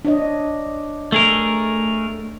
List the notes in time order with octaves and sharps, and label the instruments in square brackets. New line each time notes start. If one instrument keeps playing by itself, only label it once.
[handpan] D4 C#5 D#5
[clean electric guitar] A3 G#4 A#4